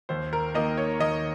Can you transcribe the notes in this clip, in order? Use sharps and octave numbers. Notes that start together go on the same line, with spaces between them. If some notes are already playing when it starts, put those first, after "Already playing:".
D#2 C5
A#4
D#3 A#3 D#5
C#5
D#2 D#5